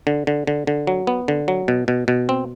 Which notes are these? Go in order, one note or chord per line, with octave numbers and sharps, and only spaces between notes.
D3
D3
D3
D3
F#3
B3
D3
F#3
B2
B2
B2
C4